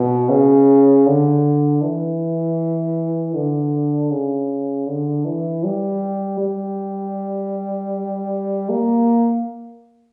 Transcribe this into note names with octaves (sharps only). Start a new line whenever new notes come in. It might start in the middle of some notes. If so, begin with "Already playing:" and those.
Already playing: B2
C#3
D3
E3
D3
C#3
D3
E3
G3
G3
A#3